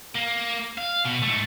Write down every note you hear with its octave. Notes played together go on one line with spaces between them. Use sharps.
A#3
F5
B2
G#2 A3